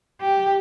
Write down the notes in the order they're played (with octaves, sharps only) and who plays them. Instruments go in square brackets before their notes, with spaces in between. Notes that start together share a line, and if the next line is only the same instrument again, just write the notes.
[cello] G4